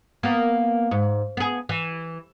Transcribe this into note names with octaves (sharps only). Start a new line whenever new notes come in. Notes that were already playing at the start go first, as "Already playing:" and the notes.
A#3 B3
G#2
B3 G#4
E3